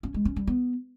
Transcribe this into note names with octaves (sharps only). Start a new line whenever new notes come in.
C#4
G#3
C#4
G3
B3